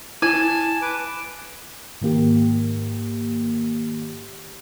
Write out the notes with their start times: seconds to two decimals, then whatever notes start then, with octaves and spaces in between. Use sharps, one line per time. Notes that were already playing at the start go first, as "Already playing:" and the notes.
0.22 E4 G#5 A5
0.82 B4 D6
2.01 G#2 D#3 A#3 G4